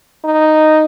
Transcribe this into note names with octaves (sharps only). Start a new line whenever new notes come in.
D#4